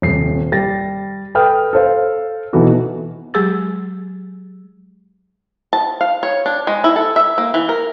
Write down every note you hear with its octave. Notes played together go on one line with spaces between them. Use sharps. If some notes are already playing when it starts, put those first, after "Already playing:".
D#1 C3 C7
G3 A6 A#6
A4 B4 G5 D#6 F6
A4 C5 F5
B2 E3 B3 D#4 F#4 A4
F#3 G#3 G4 G#4 E6 A6
A5
F5
C#5
D4
G#3
E4
A4
E5
A#3
E3
A#4